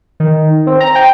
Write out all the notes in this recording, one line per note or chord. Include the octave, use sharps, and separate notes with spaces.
D#3
C4
A#5
G5